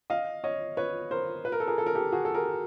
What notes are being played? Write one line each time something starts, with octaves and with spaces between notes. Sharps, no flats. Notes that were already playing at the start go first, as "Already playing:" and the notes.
D#5 F5
C#5 D#5
B4 C#5
A#4 C5
B4
A#4
A4
G#4 A#4
A4
A#4
G4 A4
F#4 G#4
A4
G#4 A#4